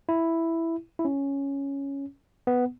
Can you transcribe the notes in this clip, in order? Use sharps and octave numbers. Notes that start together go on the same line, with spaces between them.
E4
E4
C#4
B3